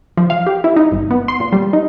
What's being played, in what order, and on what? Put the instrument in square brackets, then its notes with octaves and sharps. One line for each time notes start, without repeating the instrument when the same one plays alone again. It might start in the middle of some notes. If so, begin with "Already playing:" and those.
[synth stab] F3
F5
G4
E4
D#4
G1
B3
C6
A#2
G3
D#4